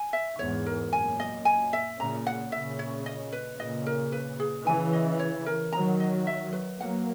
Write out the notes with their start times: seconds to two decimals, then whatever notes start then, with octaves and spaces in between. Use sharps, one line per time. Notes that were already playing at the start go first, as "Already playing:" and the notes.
Already playing: G#5
0.13 E5
0.39 E2 G#2 C#5
0.66 A#4
0.92 F#2 A#2 G#5
1.20 D#5
1.45 G#5
1.73 E5
1.99 A#2 C#3 A#5
2.27 F#5
2.52 A#2 C#3 E5
2.79 C#5
3.06 D#5
3.32 B4
3.59 A#2 C#3 D#5
3.86 A#4
4.12 B4
4.40 G#4
4.66 C#3 E3 G#5
4.93 D#5
5.19 C#5
5.46 A#4
5.73 D#3 F#3 A#5
6.00 D#5
6.27 E5
6.53 B4
6.80 F#3 A#3 F#5